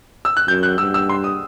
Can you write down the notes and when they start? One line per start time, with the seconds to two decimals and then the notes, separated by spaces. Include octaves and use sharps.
0.25 E6
0.37 F#6
0.48 F#2 G6
0.63 F#6
0.78 G2 E6
0.94 E6
1.09 C6
1.24 D#6